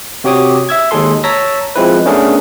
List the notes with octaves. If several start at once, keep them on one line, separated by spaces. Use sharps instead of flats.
C3 F#4 G4 C#5 D6 D#6
E5 E6 G#6
D#2 G#3 G#4 A4 C6
C#5 A5 A#5 E6 A#6 B6
F3 G#3 C4 E4 B4
A3 B3 C#4 D4 G#4 A#4